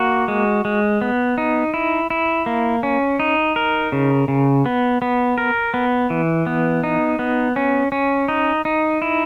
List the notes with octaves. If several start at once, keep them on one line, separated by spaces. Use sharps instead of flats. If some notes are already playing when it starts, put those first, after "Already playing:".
Already playing: A#3 F#4
G#3
G#3
B3
D#4
E4
E4
A#3
C#4
D#4
A#4
C#3
C#3
B3
B3
A#4
B3
E3
B3
D#4
B3
C#4
C#4
D#4
D#4
E4